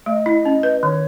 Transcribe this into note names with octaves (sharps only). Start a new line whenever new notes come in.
A3 D#5
E4
C#4
B4
D#3 C#5